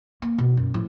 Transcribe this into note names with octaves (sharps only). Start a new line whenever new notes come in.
A#3
B2
F#2
A2 F3